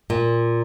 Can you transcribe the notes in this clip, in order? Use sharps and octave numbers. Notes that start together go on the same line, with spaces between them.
A#2